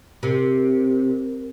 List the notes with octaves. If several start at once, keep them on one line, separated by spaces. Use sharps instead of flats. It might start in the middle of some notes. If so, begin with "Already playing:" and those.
C3 A#4